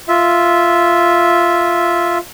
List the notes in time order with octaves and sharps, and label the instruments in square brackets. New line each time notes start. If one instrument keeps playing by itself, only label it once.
[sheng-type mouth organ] F4 E5